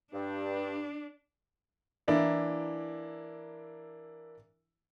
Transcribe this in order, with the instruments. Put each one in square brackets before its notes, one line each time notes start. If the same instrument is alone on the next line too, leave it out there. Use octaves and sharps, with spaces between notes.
[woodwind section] G2 [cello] D4
[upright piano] E3 A#3 D4 E4